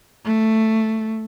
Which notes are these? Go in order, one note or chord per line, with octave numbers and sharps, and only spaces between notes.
A3